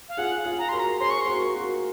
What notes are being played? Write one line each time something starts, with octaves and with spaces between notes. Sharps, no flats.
F5
F4 G#4 F#5
F4 G#4
A#5
F#4 A#4 C6
A#5
G#4 C5 C6
C#6
C6
F#4 A#4
F#4 A#4